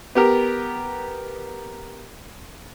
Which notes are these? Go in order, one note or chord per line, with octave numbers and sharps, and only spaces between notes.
B3 G4 A#4